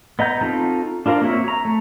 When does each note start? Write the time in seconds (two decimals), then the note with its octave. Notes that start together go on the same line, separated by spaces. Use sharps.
0.19 B3 D#5 A#5 G6
0.41 C4 D#4 F4 F#4 A4
1.06 D4 F4 A#4 C5 D5
1.21 A#3 C4 F#4 C#5 E5
1.48 A#5
1.65 A3